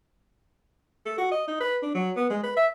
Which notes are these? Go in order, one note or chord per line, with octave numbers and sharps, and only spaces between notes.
A4
F#4
D#5
D#4
B4
D4
F#3
B3
G#3
B4
E5